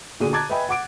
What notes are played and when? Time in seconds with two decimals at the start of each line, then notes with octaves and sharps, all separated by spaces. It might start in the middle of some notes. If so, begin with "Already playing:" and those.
0.20 A#2 D3 F#4 G#4 D#7
0.33 A5 A#5 D6 F#6 G#6 A6
0.49 B4 D#5 E5 G5 G#5 B5
0.69 F#5 D6 D7